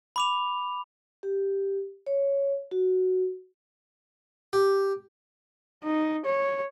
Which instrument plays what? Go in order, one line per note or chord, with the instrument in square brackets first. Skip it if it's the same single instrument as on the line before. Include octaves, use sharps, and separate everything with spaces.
[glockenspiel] B5 D6 F7
[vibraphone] G4
C#5
F#4
[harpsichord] G4
[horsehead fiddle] D#4
C#5